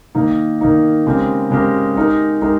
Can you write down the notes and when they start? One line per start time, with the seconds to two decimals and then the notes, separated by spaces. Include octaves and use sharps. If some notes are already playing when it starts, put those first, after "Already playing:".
0.15 D#3 A#3 D#4
0.61 D#3 A#3 D#4
1.06 C#3 G#3 C4 G4 A#4
1.50 C#3 G#3 C4 G4 A#4
1.96 G#3 D#4 G4 A#4
2.42 G#3 D#4 G4 A#4